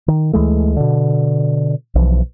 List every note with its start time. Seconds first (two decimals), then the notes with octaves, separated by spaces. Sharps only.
0.08 D#3
0.33 D2 E3 G#3 A3
0.76 B2 D3
1.95 B1 E3 F3